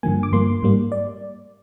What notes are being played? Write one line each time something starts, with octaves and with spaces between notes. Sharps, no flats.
G2 D3 F3 A#3 G#5
D6
G2 F3 A#3 C6
G#2 G3 A#3
D5